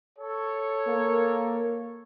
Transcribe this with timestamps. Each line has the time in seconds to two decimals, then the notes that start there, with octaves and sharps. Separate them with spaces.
0.18 A4 C#5
0.87 A#3